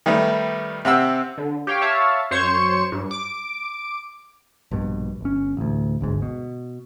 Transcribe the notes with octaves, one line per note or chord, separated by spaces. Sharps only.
D#3 G3 A3 B3
C3 C4 F#5 E6
D3
G4 C#5 F5 G5
C#5 E5 F5 A5
F#2 C5 C#5 C#6 C#7 E7
G2
D6 D7
A#1 G2 B2
G1 C#4
A1 D2
G1 D2 G#2
B2